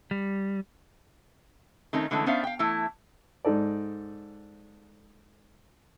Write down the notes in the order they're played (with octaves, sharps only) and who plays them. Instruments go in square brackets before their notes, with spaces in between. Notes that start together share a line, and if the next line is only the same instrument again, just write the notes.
[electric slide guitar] G3
[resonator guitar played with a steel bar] D#3 A3 C4 C#4 D#4
D3 E3 G#3 A3 C#4
B3 C#4 D4 C5 E5 F5
F5 G5
E3 A3 E4
[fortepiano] G#2 D#4 A4 D5